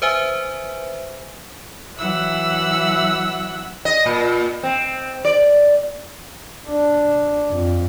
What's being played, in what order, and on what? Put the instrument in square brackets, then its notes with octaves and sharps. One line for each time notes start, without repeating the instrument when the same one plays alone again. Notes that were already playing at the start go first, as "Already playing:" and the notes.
[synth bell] B4 C5 E5 G#5
[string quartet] E3 F#3 E5 F#5 E6 F#6
[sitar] D#5
A#2
C4
D5
[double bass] D4
F2